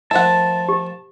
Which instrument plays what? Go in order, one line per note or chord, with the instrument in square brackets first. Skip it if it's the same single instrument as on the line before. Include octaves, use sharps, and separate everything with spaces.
[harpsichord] D#3 F3 A3 [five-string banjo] E5 F#5 [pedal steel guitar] A5
[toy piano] G4